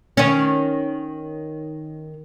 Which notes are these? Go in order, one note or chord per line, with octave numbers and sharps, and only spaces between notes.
D#3 C#4